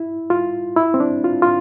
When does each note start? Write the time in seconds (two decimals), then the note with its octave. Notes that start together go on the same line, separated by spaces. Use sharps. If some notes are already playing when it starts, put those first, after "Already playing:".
Already playing: E4
0.30 F4
0.76 E4
0.94 C4
1.00 D4
1.24 F4
1.42 F4